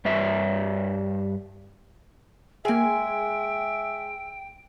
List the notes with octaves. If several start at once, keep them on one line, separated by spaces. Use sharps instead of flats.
G2 B4 E5
G#3 A#3 G#4 E5 G5 G#5